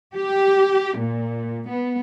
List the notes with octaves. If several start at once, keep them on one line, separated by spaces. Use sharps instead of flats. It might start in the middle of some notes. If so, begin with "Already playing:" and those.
G4
A#2
B3